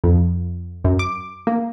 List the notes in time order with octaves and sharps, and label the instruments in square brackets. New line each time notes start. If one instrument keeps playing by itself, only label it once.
[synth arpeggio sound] F2
F#2
D6
A#3